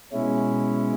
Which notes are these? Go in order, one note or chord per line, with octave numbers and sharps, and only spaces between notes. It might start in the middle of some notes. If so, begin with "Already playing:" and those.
B2 G#3 C#4 E4